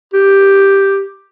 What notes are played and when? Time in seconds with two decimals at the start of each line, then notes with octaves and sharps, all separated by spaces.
0.13 G4